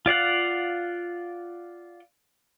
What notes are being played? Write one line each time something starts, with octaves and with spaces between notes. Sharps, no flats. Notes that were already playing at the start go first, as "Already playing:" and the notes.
F4 D5 F5 F#5